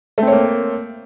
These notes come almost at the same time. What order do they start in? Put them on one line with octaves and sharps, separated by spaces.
A3 C4 C#5 A#3